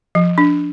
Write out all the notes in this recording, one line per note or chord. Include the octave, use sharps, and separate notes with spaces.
F3
D4